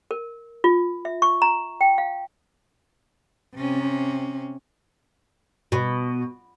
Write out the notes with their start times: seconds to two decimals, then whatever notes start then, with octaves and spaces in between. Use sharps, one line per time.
0.11 A#4
0.64 F4
1.05 E5
1.22 C#6
1.42 A#5
1.81 G5
1.98 F5
3.56 C3 C#4
5.72 B2